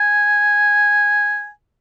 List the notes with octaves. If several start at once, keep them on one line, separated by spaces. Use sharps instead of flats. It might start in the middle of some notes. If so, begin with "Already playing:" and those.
Already playing: G#5